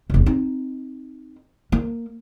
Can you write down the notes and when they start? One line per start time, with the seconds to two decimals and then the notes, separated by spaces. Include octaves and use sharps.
0.10 F1 C#2
0.26 C4 D#4
1.72 A#3